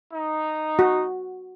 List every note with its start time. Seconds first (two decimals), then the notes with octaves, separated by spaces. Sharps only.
0.14 D#4
0.79 F#4